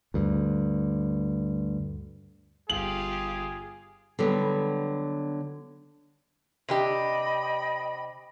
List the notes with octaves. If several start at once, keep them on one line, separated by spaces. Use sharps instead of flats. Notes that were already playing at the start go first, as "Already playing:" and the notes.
D2 G2
G1 F4 G4 G#4 F#7
D3 F#3 G3 B3
C3 D4 G4 D#5 G5 B5